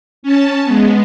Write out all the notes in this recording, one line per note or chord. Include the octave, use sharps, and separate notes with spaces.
C#4 A5
G#3 B3